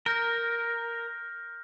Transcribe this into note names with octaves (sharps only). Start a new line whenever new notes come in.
A#4 F6 G6 A#6